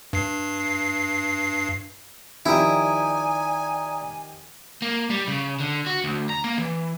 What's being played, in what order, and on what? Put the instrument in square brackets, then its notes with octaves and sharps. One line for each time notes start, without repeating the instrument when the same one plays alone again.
[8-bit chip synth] G2 C7
[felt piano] D#3 F3 G4 [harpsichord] E4 [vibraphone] D5 A#5 D#6 [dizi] G#5
[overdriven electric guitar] A#3
G3
C#3
D3
F#4
D2
A#5
A#3
E3